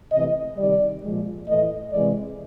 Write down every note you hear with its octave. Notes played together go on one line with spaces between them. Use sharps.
C3 E3 A3 D#5
C3 D#3 G3 D5
A#2 F3 G#3
A2 E3 A3 D#5
C3 E3 G#3 D5